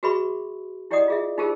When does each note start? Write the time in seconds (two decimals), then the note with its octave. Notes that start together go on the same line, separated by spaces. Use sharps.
0.03 F#4 G#4 B4 E5 B5 C#6
0.91 E4 G4 D5 D#5 F#5 D#6
1.08 F4 G#4 E5
1.38 D#4 F4 G4 G#4 A#4 C5